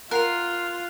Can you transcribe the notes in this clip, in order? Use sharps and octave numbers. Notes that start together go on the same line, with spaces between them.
F4 A#4 F#5 F#6 C7 F7